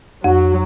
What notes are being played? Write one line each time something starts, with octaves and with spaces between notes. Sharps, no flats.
F2 F#3